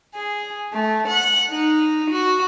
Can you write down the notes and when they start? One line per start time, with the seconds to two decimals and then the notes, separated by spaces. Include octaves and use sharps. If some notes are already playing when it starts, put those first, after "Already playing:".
0.14 G#4
0.73 A3
1.09 F#5
1.49 D#4
2.10 F#4